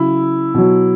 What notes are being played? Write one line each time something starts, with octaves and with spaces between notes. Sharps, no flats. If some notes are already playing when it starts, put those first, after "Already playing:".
Already playing: C#3 F#3 E4
B2 F#3